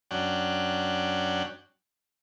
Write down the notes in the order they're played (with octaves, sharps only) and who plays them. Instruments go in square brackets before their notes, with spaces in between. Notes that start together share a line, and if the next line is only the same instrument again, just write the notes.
[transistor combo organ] F#2 C#4 D4 F#5 G5